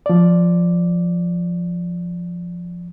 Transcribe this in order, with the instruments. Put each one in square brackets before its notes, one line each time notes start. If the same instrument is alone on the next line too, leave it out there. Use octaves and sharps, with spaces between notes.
[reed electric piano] F3 D5